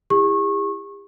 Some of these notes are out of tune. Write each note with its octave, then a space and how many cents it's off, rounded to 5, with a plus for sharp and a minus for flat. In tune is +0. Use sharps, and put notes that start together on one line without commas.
E4 +10 G4 +45 C#6 -25